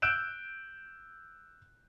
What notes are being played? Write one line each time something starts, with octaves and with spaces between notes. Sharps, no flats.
E6 F#6 G6 D7 E7